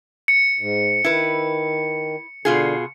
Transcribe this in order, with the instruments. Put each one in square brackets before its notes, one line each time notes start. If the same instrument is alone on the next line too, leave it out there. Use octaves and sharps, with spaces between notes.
[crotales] C#7
[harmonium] G#2
[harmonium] D#3 [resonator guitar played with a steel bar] E4 B4
[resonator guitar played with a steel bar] B2 F4 G#4 [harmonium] D3